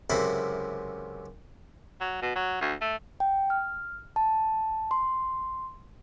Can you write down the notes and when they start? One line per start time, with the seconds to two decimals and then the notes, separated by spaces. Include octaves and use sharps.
0.10 C#2 F#2 C3 E4 C5 B5
2.01 F#3
2.22 B2
2.36 F#3
2.61 D2
2.81 A3
3.20 G5
3.50 F6
4.16 A5
4.91 C6